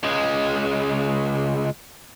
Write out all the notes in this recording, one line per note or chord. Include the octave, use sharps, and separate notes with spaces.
C#2 G#3